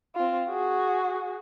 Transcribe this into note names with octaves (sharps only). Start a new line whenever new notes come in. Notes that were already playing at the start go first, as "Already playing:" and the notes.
C4 F4
F#4 G#4